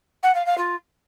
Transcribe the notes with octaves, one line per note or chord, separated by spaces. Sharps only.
F#5
F5
F5
F4